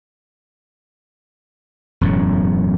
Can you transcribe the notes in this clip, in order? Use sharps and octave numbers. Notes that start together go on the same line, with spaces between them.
E1 F#2 A2 F#3